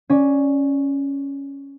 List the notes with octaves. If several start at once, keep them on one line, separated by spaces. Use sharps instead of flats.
C#4 D5